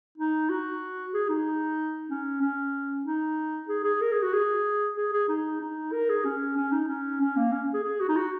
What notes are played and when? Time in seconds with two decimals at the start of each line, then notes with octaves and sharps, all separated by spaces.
0.18 D#4
0.50 F#4
1.14 G#4
1.29 D#4
2.10 C#4
2.41 C#4
3.05 D#4
3.68 G#4
3.84 G#4
4.01 A#4
4.12 G#4
4.22 F#4
4.33 G#4
4.97 G#4
5.13 G#4
5.29 D#4
5.61 D#4
5.92 A#4
6.09 G#4
6.24 C#4
6.57 C#4
6.72 D#4
6.88 C#4
7.21 C#4
7.36 A#3
7.52 C#4
7.74 G#4
7.84 G#4
8.00 F#4
8.09 D#4
8.17 F#4